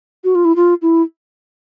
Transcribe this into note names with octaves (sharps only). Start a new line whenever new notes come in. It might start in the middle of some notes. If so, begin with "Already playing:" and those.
F#4
F4
E4
F4
E4